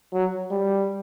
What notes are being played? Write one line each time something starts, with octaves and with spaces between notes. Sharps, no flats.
F#3
G3